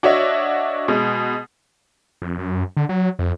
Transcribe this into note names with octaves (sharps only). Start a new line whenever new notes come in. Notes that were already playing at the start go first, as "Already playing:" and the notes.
D4 F#4 C#5 D#5 E5
B2 G#3
F2
F#2
D3
F#3
F2